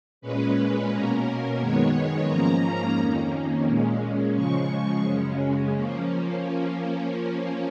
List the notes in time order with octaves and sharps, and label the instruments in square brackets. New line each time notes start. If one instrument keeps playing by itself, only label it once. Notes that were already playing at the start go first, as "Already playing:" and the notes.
[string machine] A#2 G#3 C#4 B4
B2 A#3 C#4 A#4
F#2 D#3 G#3 B3 C#5
G#2 F3 A#3 C#4 A#5
F2 D#3 A#3 C#4
A#2 G#3 C#4
C#3 F3 G#3 C#6
F#2 C#3 G#3 C#4
F3 A#3 C#4